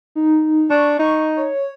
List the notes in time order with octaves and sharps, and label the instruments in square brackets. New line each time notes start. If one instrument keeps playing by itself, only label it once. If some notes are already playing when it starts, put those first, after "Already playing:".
[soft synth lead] D#4
[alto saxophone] D4 [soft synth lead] C#6
[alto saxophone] D#4
[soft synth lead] C#5